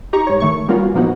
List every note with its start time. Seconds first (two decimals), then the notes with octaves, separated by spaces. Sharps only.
0.13 D#4 G4 A#5 C#6
0.27 G#2 C#5
0.40 D#3 A3 C#6
0.68 G3 A#3 B3 C#4 F4 F#4
0.94 A#2 F3 A#3 B3 D#4 F#4